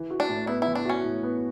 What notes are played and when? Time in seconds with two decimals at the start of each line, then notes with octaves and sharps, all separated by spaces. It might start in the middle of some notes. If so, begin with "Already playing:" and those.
Already playing: E3
0.10 F#4
0.20 D4
0.29 A2
0.47 B3 E4
0.62 E3 E4
0.75 D4
0.85 C#4 F#4
1.04 A2
1.23 B3